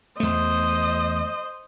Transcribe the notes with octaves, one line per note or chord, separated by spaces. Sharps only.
E2 A3 C5 D#5